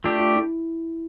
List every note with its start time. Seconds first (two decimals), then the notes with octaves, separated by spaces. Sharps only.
0.04 A3 D4 F4 G4
0.20 F4
0.36 E4